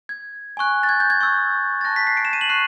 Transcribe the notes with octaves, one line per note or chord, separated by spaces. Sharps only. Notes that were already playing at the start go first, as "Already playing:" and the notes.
G#6
G#5 C#6 F#6
A6
G#6
G6
G#6
C#6 E6 G6
A6
A5 C#6 F#6 A#6
B6
C7
D7
E7
D#7
F#7
C#6 F#6 C7